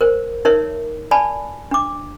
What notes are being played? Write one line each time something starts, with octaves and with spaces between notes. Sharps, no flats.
A#4 C5
D#4 A#4 C#5 E5
D5 G#5 A5 B5
D4 D6